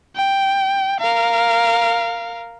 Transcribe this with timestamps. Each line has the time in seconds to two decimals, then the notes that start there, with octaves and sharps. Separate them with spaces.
0.16 G5
1.01 A#4 F5